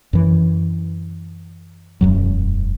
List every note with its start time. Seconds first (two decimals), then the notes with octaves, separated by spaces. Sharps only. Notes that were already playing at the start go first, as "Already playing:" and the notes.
0.13 F#2 E3
2.01 E1 F#2 F#3